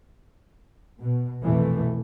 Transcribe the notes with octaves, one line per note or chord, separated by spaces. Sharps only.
B2
C2 F2 B2 E3 A3